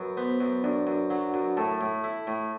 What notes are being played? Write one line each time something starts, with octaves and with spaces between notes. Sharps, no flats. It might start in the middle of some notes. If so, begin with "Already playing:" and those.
Already playing: F#2 B4
B3 C5
F#2
F#2 D4 D5
F#2
F#3 F#4 F#5
F#2
A2 A4 A5
A2
E4
A2